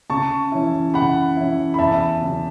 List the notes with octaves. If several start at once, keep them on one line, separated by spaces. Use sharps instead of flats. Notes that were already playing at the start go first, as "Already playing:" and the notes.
C#3 A5 C#6
E3 C#4 E4
C#3 F#5 B5
E3 C#4 E4
B5
E2 E5 A5
C#3 F#3